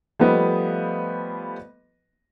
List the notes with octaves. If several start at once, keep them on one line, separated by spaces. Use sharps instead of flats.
F3 G3 A3 B3 B4 D#5